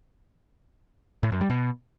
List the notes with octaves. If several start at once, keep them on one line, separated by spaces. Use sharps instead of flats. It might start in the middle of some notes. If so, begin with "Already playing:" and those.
A2
F#2
G3
B2